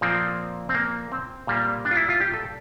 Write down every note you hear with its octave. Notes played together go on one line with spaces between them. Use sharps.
A#2 F3 A#3 C4
C4
A#3
C4
A#2 G3 A#3
D4
F4
E4
F4
G4
A4